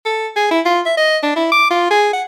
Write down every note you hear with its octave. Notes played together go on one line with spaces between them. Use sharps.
A4
G#4
E4
F4
E5
D#5
D4
E4
D6
F4
G#4
F#5